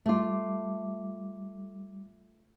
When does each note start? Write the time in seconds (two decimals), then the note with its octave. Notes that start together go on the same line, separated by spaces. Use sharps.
0.06 G3 A3 F4 D6